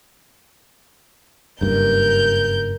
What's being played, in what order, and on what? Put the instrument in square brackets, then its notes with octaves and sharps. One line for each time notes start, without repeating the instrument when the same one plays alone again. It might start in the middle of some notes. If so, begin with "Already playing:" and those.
[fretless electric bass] F#1 G2 [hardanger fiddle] A#4 [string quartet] G6